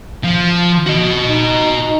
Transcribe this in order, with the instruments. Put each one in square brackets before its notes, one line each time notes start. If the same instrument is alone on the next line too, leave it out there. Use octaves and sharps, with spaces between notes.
[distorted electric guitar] F3
F#4 D#5
[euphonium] D#4